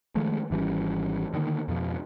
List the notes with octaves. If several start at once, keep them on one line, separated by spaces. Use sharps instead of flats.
D#3 F3 G#3 A3
G#1 E3 G3 C#4
D3 D#3 G3 A#3
F2 B2 F3